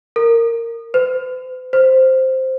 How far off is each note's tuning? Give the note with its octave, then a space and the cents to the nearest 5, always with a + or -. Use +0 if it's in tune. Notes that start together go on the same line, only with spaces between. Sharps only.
A#4 -15
C5 -45
C5 +0